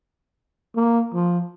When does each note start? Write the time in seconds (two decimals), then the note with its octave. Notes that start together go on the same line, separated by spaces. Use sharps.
0.76 A#3
1.14 F3